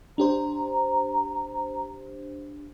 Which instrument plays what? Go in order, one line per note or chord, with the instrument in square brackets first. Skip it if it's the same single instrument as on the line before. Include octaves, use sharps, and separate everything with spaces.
[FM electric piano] D4 G4 C5 [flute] A#5